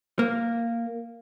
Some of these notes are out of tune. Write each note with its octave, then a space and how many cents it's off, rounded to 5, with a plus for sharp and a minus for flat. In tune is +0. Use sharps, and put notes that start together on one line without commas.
A#3 -5